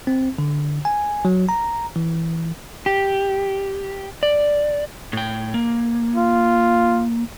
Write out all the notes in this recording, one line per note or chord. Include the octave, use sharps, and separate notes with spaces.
C4
D3
G#5
F#3
A#5
E3
G4
D5
A2 G5
A#3
F4